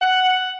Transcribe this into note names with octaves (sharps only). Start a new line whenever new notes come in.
F#5